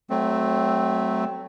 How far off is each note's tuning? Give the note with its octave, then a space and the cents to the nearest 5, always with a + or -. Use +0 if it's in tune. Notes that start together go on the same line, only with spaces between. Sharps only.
F#3 +30 A3 -5 C4 +0